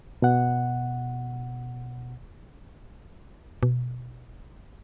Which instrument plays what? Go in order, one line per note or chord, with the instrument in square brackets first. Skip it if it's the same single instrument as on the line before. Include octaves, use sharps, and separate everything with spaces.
[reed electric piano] B2 F#5
[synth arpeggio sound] B2